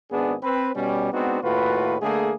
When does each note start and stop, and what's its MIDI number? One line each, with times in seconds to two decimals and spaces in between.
0.11 0.34 32
0.11 0.34 59
0.11 0.34 62
0.11 0.34 68
0.42 0.70 60
0.42 0.70 71
0.75 1.12 47
0.75 1.12 55
0.75 1.12 61
1.12 1.39 56
1.12 1.39 59
1.12 1.39 60
1.12 1.39 62
1.12 1.39 63
1.12 1.39 66
1.42 1.96 39
1.42 1.96 45
1.42 1.96 65
1.42 1.96 66
1.42 1.96 71
2.01 2.33 50
2.01 2.33 57
2.01 2.33 58
2.01 2.33 68